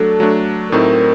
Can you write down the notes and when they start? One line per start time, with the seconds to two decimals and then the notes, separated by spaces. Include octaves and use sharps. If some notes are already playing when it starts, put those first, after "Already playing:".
Already playing: F#3 A3 D4 A4
0.20 F#3 A3 D4
0.71 A2 F#3 A3 C4 D#4 A#4